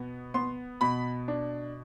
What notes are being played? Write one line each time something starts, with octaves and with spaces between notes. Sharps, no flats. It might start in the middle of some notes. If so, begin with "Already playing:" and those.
Already playing: B2 B3
B3 C6
B2 B5
D4